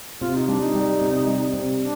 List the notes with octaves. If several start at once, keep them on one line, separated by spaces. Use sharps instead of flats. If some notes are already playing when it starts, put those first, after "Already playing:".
C3 F4
D#4
G3 D4
D#4
G3
C3
G3
C3
D4